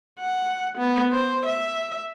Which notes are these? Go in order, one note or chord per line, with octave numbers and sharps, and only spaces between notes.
F#5
B3
C5
E5